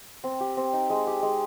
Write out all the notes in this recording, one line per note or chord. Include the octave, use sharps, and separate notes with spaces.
C4
G4
C4
D#4
G#3
G4
G#3